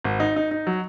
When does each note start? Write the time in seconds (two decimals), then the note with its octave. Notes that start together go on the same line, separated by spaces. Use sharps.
0.04 G#1
0.20 D#4
0.36 D#4
0.51 D#4
0.67 F#3